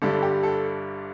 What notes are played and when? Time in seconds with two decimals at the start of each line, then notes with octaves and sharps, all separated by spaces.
0.02 G1 G2 D3 G3 D4 A4
0.23 G4
0.43 A4